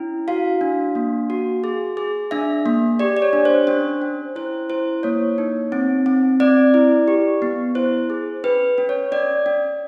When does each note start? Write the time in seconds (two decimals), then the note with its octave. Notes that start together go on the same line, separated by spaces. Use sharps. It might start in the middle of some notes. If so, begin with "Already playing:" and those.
Already playing: C#4 E4
0.28 F#4 F5
0.61 D4
0.95 A#3
1.30 F#4
1.64 G#4
1.97 G#4
2.31 D4 E5
2.66 A#3
2.99 G4 D5
3.17 D5
3.22 C#5
3.33 D4
3.45 C5
3.67 C#4 C5
4.02 C#4
4.36 E4 C5
4.70 E4 C5
5.03 A#3 C#5
5.38 D#4
5.72 C4
6.06 C4
6.40 C4 D5
6.74 E4
7.08 G4
7.42 B3
7.75 E4 C5
8.10 G#4
8.44 C#4 B4
8.78 C#4
8.89 C#5
9.12 C#4 D5
9.46 C#4